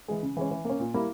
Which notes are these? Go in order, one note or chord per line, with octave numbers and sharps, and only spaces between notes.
E3 G#3
C#3
E3 G#3 C#4
E3
A#3 C#4
A#2
G3 A#3 E4